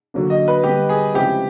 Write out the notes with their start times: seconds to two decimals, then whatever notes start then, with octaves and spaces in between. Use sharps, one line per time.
0.14 D3 F#3 A#3 D4
0.30 D#5
0.48 B4
0.64 D3 G3 B3 G4
0.89 G#4
1.14 C#3 F3 G#3 C4 E4 G4